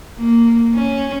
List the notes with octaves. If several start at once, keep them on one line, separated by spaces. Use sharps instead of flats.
A#3
C#4